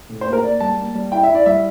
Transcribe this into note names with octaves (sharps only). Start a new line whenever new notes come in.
A2
C5
A#3
A#4
A#3 D5
G3 A5
A#3
G3
E4 G5
E5
E4
D5
G3 E5